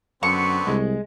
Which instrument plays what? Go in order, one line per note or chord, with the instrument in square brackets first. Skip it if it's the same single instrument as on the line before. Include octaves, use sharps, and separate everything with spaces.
[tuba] F#2 [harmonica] D3 B3 C4 [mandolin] C#6
[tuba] C2 [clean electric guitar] G#3